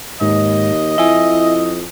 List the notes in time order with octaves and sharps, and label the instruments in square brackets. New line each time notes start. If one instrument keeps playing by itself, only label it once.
[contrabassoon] D#2 [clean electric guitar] G#2 [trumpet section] D#5
[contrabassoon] F2 [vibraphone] E4 [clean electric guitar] E5 G#5